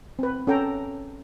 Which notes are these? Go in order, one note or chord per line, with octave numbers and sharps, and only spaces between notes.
C4 B4
C#4 A4 G5 A#5